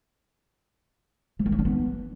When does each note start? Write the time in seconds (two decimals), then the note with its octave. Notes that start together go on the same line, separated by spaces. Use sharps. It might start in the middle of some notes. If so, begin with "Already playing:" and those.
1.39 F3
1.46 A#3
1.52 C#4
1.59 D4
1.65 B3